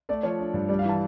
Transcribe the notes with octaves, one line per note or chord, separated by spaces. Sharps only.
A3 D5
F3 C#5
D4
G2
G3 D5
F5
E3 A5